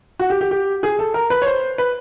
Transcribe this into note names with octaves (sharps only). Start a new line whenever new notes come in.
F#4
G4
G4
G4
G#4
A4
A#4
B4
C#5
C5
B4